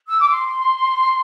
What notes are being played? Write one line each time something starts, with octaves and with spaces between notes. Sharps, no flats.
E6
D6
C6